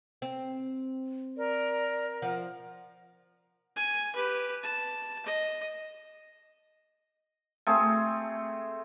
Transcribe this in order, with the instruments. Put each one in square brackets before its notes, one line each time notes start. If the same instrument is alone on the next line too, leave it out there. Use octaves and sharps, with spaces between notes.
[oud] C4
[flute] A#4 [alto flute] D5
[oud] F3 [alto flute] F#5
[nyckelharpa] G#5
G4 B4
A5
D#5
[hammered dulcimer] A3 C4 G#4